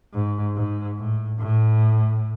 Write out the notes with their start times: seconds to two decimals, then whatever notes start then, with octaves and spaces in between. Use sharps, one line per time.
0.13 G#2
0.55 G#2
0.98 A2
1.39 A2